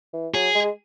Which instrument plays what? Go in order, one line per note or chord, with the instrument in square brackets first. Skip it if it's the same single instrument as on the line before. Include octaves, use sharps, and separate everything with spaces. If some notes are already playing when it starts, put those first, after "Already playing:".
[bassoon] E3
[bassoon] F#3 [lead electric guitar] G#4
[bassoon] G#3